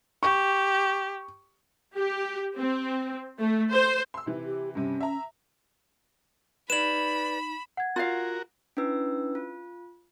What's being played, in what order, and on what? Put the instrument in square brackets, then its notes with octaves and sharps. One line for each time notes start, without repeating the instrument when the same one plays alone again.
[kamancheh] G4 [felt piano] C#6
[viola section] G4
C4
A3
C5
[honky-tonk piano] C6 E6
C3 E3
[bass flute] G4
[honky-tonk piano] G2 C3 [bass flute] C#4
[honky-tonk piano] E5 A#5
[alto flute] D#4 [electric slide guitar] B4 D5 [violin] B5 [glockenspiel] E7 F#7
[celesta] F#5 G#6
[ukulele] F4 F5 [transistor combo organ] F#4 A#4
[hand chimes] C#4 D4 E4 B4 E6
F4